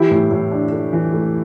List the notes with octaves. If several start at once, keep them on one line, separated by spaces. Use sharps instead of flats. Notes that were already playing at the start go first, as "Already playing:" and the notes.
Already playing: E3 E4 G4
A2
A2
D4
A3
E3
A3